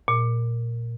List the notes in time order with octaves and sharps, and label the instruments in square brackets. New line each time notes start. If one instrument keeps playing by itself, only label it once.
[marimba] A#2